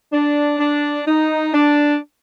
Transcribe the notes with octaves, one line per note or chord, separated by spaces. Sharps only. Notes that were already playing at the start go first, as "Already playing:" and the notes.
D4
D4
D#4
D4